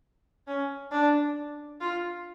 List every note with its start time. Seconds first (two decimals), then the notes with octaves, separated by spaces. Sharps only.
0.47 C#4
0.92 D4
1.81 F4